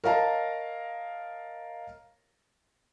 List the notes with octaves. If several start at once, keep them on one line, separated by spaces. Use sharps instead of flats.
A#4 C#5 D#5 F5 A5 A#5